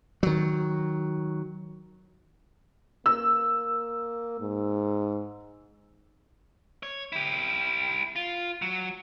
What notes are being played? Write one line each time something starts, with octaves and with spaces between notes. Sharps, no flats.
D#3 F#3
A#3 E6
G#2
C#5
E4 G4
F4
F#3